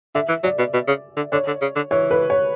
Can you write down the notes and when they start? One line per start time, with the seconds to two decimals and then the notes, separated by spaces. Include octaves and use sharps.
0.15 D3 E5
0.29 E3
0.43 F#3 D5
0.59 B2
0.74 B2
0.87 C#3
1.17 D3
1.32 D3 C#5
1.47 D3
1.62 C#3
1.76 D3
1.91 E3 C#5
2.11 B4
2.30 C#5